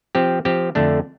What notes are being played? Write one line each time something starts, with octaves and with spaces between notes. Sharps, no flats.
F3 C4 G4
F3 C4 G4
F2 D3 A3 D4